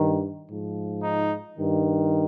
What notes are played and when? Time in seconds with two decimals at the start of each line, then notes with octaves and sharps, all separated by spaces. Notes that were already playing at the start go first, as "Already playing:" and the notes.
Already playing: G2 D#3
0.49 G#2 F3
1.03 D#4
1.58 G2 D#3